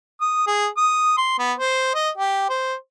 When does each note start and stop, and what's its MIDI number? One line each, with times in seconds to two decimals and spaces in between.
0.21 0.46 87
0.47 0.68 68
0.77 1.14 87
1.17 1.37 84
1.39 1.53 59
1.58 1.91 72
1.94 2.10 75
2.18 2.45 67
2.49 2.74 72